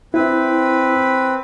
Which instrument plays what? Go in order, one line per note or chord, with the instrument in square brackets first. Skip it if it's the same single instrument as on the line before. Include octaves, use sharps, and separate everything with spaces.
[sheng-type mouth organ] C4 B4 [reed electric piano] E4